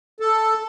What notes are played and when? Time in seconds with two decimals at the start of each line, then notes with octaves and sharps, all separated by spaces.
0.20 A4